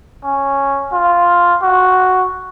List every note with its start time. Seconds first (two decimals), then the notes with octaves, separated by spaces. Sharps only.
0.25 C#4
0.93 F4
1.63 F#4